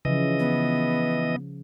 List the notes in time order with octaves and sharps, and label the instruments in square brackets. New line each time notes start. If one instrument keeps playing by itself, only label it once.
[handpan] C#3 F3 [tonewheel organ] E3 D#5
[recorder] B3